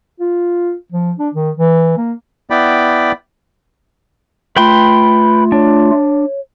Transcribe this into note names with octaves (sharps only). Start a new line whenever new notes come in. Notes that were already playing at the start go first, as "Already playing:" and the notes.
F4
F3
D4
D#3
E3
A#3
B3 E4 D5 G5 B5
A3 F4 B4 G5 B5 C6
D4 C#5